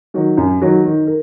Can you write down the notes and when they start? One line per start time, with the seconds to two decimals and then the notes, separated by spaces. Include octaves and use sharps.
0.14 D#3 F#3
0.37 F#2
0.61 D#3 F#3
0.85 D#3
1.07 A#4